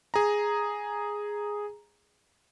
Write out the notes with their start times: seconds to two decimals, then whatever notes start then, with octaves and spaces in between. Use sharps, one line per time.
0.14 G#4 A#5